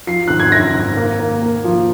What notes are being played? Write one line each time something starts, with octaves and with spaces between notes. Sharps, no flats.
F3 C7
G#1 F#6
G#6
F#2 A#6
G#1
A#3
A#3
A#3
F3